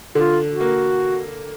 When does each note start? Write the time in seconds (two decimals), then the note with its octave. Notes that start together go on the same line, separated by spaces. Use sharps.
0.15 D3 F4
0.49 F#4
0.60 A#3